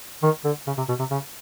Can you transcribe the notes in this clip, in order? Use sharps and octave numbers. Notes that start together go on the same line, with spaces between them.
D#3
D3
C#3
C3
B2
C3
C#3